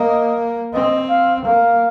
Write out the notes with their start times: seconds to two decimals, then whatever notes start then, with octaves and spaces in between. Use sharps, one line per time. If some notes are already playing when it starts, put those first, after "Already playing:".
Already playing: A#3 D#5
0.74 C4 D#5
1.10 F5
1.45 A#3 F5